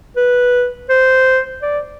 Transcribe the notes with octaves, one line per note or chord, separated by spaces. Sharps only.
B4
C5
D5